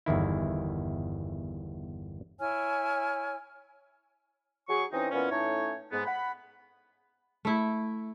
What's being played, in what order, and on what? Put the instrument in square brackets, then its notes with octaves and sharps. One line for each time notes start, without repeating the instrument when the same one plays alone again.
[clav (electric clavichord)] G1 E2 D#3 E4
[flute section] E4 C#5 G#5 F6
[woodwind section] F#3 G#4 C#6
E3 C4 C#4 D#4
A#2 E3 B3 C#4
A2 A3 C#4 D#4 C#5
G#2 B3
F#5 B5
[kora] A3 E4